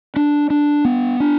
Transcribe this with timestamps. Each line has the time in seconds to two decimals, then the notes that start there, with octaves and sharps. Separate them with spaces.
0.16 D4
0.50 D4
0.85 B3
1.20 D4